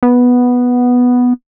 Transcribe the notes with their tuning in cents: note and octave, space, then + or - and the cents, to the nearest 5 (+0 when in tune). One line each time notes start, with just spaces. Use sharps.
B3 -5